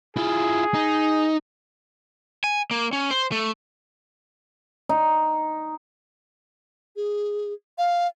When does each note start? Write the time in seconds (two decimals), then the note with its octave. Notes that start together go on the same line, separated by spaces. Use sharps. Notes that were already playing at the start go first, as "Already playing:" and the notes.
0.16 E4 F4 G#4
0.74 D#4
2.44 G#5
2.71 A#3
2.93 C#4
3.11 C5
3.32 A3
4.89 D#4
6.96 G#4
7.78 F5